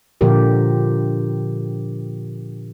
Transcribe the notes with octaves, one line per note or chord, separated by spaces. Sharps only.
A#2 D3 F3 G4 A#4